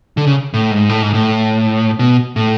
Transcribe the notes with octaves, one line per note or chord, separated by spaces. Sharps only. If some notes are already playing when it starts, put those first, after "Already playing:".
D3
C#3
A2
G#2
A2
G#2
A2
B2
A2